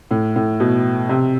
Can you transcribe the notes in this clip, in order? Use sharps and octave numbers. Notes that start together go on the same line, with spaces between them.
A2
A2
B2
C3